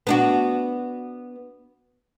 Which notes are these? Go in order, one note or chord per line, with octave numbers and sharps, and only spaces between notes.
B3 D4 F#4